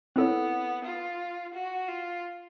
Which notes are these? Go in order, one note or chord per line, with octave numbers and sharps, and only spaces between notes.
B3 C4 E4 A4 C#5
F4
F#4
F4